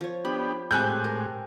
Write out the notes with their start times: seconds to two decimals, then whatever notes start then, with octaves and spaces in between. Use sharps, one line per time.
0.01 F3 C#5
0.25 B3 D4 G4 B5
0.71 A2 G#3 C4 G4 G#5 F#6 G6
1.04 A#4